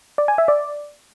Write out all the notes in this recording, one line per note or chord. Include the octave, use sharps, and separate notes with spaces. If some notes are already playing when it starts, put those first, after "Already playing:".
D5
G#5
E5
D5